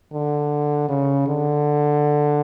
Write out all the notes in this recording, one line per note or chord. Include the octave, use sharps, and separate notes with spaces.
D3
C#3
D3